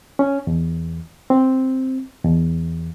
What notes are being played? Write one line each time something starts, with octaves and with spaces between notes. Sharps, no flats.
C#4
E2
C4
E2